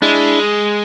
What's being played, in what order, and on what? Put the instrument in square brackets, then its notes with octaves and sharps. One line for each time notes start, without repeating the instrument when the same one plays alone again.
[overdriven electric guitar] G#3 [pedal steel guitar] D4 E4